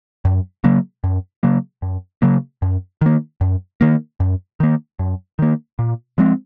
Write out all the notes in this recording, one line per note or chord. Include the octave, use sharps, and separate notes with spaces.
F#2
C#3 F#3 A#3
F#2
C#3 F#3 A#3
F#2
C#3 F#3 A#3
F#2
D#3 A#3
F#2
D#3 A#3
F#2
D#3 A#3
F#2
D#3 A#3
A#2
F3 G#3 C4